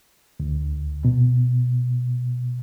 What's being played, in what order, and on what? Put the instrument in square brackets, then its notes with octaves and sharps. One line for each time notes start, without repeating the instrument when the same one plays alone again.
[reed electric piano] D2
B2